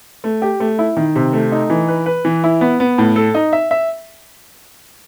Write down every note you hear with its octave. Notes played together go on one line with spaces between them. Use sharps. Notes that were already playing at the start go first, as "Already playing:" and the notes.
A3
G4
A3
E4
D#3
C3
A3
D#4
E3
B4
B4
E3
E4
B3
B3
A2
A4
D#4
E5
E5